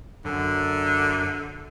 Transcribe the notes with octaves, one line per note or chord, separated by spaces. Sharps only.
F#2 D3